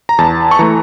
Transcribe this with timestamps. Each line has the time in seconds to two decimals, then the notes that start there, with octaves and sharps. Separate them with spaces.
0.09 A#5
0.18 E2 A5
0.51 C#6
0.59 E3 A3 A#5